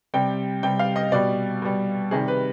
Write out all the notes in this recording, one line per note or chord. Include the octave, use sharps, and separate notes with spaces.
C3 G3 G5
C3 G3 G5
F5
D#5
B2 G3 D5
B2 G3
C3 D#3 G3 G#4
B4